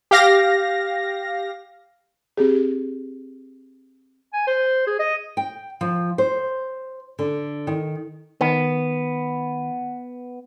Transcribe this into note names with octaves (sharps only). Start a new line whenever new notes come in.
G4 F5 A#6
C4 G4 G#4
G#5
C5
G#4
D#5
G5
F3
C5
D3
D#3
D#3 B3